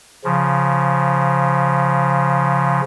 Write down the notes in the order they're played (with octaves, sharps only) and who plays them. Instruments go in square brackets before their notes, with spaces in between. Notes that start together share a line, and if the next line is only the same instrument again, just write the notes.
[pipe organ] C#3 F3